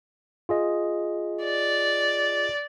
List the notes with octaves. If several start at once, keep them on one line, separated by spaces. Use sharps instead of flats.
F4 G#4 D#5
D5